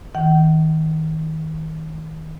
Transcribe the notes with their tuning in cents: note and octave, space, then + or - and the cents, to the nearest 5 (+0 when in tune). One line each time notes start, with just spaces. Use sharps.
D#3 +30 F#5 +40